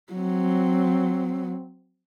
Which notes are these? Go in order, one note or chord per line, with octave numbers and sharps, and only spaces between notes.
F#3 C4